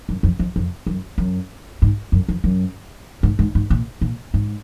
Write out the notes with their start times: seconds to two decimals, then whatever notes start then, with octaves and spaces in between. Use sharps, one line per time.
0.09 F#2
0.23 F2
0.39 F2
0.56 F2
0.87 F#2
1.18 F#2
1.82 G#2
2.12 F#2
2.29 F2
2.44 F#2
3.23 G#2
3.39 G#2
3.55 G#2
3.70 A#2
4.01 A#2
4.34 G#2